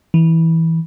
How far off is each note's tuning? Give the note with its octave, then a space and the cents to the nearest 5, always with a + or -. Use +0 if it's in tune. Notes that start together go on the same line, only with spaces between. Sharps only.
E3 -15